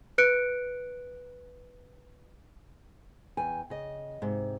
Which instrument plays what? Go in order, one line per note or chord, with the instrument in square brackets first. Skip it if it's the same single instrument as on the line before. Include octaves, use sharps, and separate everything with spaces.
[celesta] B4 F#6 C#7 D7
[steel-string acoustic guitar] E2 G5 G#5
C#3 D#5
G#2 C3